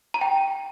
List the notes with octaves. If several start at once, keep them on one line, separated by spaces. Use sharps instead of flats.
A#5
G5